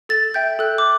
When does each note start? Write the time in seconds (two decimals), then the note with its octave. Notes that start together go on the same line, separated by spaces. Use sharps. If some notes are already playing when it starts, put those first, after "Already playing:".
0.09 A4 A6
0.34 E5 G5 G6
0.59 A4 F#6
0.78 D6